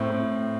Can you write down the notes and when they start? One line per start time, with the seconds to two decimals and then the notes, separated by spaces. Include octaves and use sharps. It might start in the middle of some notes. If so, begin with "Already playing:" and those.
Already playing: A2 C4
0.10 A2